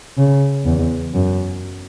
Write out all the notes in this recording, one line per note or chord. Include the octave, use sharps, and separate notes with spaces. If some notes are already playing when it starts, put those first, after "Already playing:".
C#3
E2
F#2